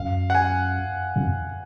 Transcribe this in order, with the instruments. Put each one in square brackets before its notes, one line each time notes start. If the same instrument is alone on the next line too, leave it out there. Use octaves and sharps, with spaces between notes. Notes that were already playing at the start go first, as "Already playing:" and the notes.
Already playing: [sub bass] F#2 [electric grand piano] F5
[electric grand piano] F#5
G#5
[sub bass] F2